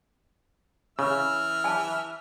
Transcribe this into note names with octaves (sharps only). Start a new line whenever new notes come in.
C#3 E3 E5 F6
G#5 A5